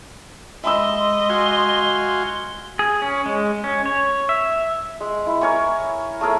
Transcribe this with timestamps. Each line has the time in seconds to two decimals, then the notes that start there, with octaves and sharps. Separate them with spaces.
0.64 G#3 D#5 E5 B5 C6 E6
1.29 F#4 F5 G#5
2.79 G#4
3.02 C#4
3.26 G#3
3.64 C#4
3.86 C#5
4.29 E5
5.00 G#3
5.27 E4
5.41 A#4 C#5 G#5 C#6
6.21 A3 G#4 A#4 C#5